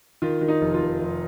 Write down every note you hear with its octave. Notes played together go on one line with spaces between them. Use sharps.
D#3 F4
D#3
D#4
F1
F4
F1
F1